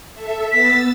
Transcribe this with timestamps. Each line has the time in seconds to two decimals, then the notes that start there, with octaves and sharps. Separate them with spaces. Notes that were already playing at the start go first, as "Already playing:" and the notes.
0.14 A4 E5
0.52 B3 E6 A6 B6